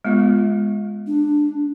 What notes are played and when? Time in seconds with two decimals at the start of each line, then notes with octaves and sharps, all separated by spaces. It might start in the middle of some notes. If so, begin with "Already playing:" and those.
0.05 G#3 B3 F4
1.07 D4